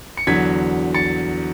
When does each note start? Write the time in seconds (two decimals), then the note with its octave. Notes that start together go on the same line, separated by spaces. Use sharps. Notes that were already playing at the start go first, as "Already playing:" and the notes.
0.17 C#7
0.27 E2 D3 F#3 G#6 B6
0.94 A6 C#7